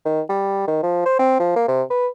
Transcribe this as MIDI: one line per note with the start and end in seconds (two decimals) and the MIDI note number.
0.05 0.21 51
0.30 0.65 55
0.68 0.81 51
0.83 1.04 53
1.05 1.19 72
1.19 1.36 60
1.40 1.54 53
1.56 1.67 58
1.68 1.83 48
1.90 2.08 71